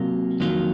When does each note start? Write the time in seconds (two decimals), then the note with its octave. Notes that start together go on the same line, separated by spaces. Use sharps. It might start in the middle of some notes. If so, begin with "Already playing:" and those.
Already playing: C3 F#3 A#3 F4
0.40 F2 D#3 F#3 A#3 F4